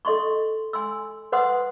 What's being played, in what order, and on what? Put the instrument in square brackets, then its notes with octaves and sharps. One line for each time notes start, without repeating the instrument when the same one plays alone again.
[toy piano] A4 D#5 C6 C#6
G#5 C6 E6
B4 C5 F#5 C6 D#6